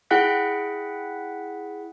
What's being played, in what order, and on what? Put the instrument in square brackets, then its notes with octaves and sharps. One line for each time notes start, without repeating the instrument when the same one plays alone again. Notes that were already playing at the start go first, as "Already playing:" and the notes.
[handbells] E4 G#4 F#5 G5 F#6 B6